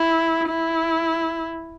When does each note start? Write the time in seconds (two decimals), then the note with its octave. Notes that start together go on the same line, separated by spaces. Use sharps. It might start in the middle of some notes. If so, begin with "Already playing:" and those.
Already playing: E4
0.48 E4